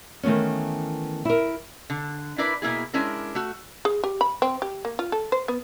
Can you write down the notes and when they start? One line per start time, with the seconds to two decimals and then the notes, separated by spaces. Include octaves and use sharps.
0.23 D#3 E3 A3 B3 C#4
1.25 E4 A#4
1.90 D3
2.38 D4 E4 A#4 B4 D5
2.62 B2 A#3 E4 G#4
2.94 G#3 C#4 D4 E4 A#4
3.35 A3 F#4
3.85 G#4
4.04 G4
4.21 B5
4.42 C4
4.62 G4
4.85 A#3
4.99 F4
5.12 A4
5.32 C5
5.48 B3